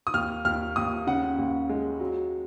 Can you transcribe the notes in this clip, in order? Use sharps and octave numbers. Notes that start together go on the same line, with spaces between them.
D#6
D#2 F6
D#2 F6
D#2 D#6
C#3 F#5
D#2
G#3
F#3